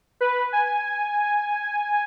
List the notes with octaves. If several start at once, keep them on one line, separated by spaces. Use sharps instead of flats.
B4
G#5